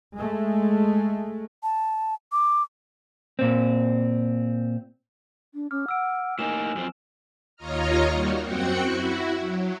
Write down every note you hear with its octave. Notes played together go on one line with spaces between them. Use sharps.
G#3 A3
A5
D6
A#2 C4
D4
C#4 D6 F6
F#5 E6 D7
A2 A#3 D#4 G#5 E7
F#2 F3 C4
D#2 F4 C#5 D#5 A#5 F6
G3 A#3 D#4 F#4
F#2 C4 F#4 F#5 G5 C#7
E4 F#4
F#3